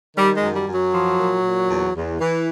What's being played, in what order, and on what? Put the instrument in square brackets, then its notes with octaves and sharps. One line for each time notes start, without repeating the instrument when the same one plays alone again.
[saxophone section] D#3 G3
G#3
F#2
G3
F#2
F#3
F3
A#2
A#2
E2
E2
E3